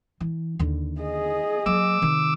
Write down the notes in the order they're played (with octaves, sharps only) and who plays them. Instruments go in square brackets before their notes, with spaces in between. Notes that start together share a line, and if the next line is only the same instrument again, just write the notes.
[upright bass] E3
D#2 D3
[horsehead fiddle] G#4 D#5
[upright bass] F#3 A#3 [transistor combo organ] D6 E6
[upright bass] C3 D#3